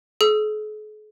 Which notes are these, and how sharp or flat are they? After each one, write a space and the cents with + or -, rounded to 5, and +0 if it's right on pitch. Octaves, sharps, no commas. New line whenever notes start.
G#4 +45 E6 +35